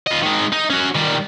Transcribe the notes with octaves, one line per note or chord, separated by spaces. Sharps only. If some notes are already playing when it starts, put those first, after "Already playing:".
F4 D#5
D#3 G#3
D#4
C#4 F#4
D#3 G3